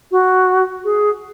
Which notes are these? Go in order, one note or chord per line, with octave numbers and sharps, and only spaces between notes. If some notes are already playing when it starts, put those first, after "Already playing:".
F#4
G#4